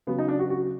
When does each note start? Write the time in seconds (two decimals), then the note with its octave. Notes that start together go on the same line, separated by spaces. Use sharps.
0.07 C#3 F#3 B3
0.18 D#4
0.28 D4
0.39 F#4
0.50 F#4